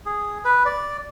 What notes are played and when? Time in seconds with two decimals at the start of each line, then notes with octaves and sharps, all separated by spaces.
0.06 G#4
0.45 B4
0.65 D5